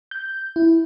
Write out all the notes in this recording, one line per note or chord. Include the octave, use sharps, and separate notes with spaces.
G6
E4